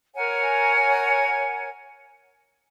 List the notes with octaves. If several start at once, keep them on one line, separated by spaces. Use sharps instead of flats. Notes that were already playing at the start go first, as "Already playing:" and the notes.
A#4 C#5 F#5 G#5